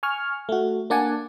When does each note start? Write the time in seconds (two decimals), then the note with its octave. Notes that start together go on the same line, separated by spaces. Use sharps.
0.03 G#5 C#6 F6
0.49 A3 F#4
0.90 A#3 D4 D5 F#5 G#5 A5